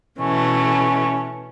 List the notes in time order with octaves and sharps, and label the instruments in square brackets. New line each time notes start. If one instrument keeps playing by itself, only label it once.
[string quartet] B2 E3 A3 [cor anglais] C#4